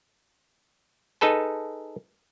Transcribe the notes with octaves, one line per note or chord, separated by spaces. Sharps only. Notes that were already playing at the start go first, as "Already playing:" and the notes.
D#4 G#4 A4 B4 A5